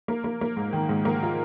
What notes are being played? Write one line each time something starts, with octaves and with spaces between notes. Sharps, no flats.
A#3
A#3
A#3
G#2
D#3
G#2
A#3
F4